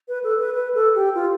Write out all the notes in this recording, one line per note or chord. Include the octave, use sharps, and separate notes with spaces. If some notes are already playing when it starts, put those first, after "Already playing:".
B4
A4
B4
B4
A4
G4
F4